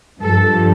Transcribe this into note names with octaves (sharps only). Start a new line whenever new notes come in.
G2 F3 A4